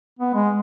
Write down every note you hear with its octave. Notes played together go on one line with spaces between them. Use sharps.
B3
G#3